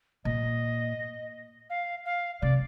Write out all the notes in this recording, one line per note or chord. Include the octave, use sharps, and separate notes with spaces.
A#2 D#5
F5
F5
C3 D5